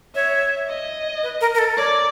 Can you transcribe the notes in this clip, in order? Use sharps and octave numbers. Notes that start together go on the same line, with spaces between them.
C#5 E5
D#5
B4
A#4
A#4
A4
C#5 D5